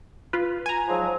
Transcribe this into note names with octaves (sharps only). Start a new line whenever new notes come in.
F4 B4
G#5 A#5
G#2 F3 F#3